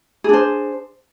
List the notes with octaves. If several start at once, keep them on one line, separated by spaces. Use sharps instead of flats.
D4 G#4 C5